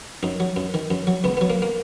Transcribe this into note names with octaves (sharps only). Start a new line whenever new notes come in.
F#2 D#4
F#3
F#2
D#3
F#2
F#3
C#2 B3
F#3 B3
A#3
A#3